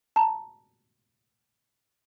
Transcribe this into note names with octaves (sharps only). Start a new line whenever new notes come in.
A5 A#5